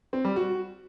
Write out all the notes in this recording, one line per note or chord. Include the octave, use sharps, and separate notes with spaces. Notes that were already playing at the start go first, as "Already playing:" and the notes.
C4
G3
F#4